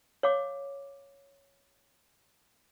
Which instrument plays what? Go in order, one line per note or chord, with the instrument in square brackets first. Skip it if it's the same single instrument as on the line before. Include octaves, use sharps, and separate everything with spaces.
[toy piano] C#5 F5 D6